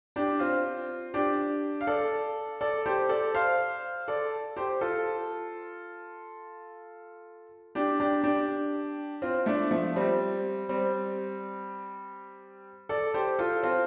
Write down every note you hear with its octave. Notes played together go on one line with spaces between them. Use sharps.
D4 G4
C4 F4
D4 G4
F5
A4 D5
A4 D5
G4 C5
A4 D5
C5 F5
A4 D5
G4 C5
F4 A4
D4 G4
D4 G4
D4 G4
C4 F4
A3 D4
F3 A3
G3 C4
G3 C4
A4 D5
G4 C5
F4 A4
C4 F4